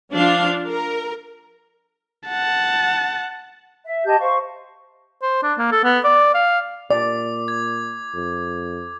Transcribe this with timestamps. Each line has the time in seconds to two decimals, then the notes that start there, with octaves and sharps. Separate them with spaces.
0.13 F3 D4 F5
0.68 A#4
2.28 F#5 A5
3.84 E5
4.05 G4 D#5 A5 G6
4.19 C5 F5 C#6
5.22 C5
5.43 D4
5.59 A#3
5.72 A4
5.85 B3
6.05 D5
6.34 F5
6.90 A#2 D5 D6
7.48 G#6
8.14 F2